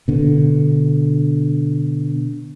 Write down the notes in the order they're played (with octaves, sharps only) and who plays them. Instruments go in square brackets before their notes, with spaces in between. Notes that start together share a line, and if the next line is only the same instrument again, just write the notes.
[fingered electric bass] B2 D3